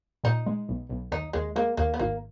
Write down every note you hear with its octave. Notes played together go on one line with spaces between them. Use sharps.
A#2 D#4
G#3
B1
B1
D#2 D#4
D#2 G#3
G#3 A#3
D#2 A#3
B3
G#1 A#3